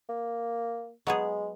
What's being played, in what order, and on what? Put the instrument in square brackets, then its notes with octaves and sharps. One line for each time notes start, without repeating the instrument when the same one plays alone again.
[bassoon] A#3
[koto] F#3 B3 G#4 [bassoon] G#3